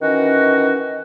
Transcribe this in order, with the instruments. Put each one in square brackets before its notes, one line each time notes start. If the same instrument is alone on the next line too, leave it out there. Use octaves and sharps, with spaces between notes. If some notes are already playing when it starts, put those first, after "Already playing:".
[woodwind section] D#3 E3 C#4 F#4 D#5